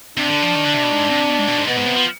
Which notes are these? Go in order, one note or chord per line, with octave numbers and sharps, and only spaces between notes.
C3 D4
D3
F3
D#3
D3
C3
B2
G#2
C3
B2
G#2
B2
G#2
B2 B3
G#2
C3
F3